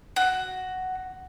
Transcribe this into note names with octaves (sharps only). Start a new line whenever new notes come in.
F#4